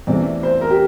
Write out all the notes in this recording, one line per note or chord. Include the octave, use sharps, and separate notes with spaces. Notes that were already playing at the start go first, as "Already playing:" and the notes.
E2 C3 E3 A3 D5
C5
A#4
G4